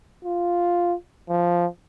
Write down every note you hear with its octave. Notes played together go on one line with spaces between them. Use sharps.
F4
F3